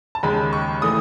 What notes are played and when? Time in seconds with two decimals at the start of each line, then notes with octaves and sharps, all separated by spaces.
0.15 A5
0.23 D#2 C#3 G#3 B5
0.53 C#6
0.82 E3 A3 D#6